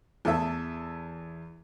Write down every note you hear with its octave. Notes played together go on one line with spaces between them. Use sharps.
E2 E3 A4 E5